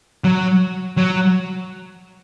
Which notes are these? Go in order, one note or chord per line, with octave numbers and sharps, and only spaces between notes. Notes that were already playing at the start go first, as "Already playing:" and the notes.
F#3
F#3